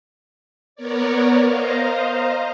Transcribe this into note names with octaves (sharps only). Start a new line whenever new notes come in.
B3 A#4 C#5 D5
C5 D#5 F5 A#5